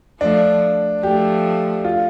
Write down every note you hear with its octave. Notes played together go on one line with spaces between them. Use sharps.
F3 A3 D4
F3 A3 G4
F4